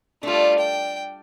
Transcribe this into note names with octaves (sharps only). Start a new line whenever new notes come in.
G3 A3 D4 F4
G5